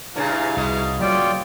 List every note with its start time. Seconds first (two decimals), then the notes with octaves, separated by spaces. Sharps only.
0.16 G2 A#2 C#3 E4 F5
0.57 C2 B2 D#5
1.01 F#3 A#3 C#4 F4 F#4 C#5 D5 G5